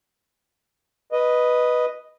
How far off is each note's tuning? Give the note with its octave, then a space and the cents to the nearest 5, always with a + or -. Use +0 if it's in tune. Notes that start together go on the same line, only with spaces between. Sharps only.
B4 -5 D#5 +0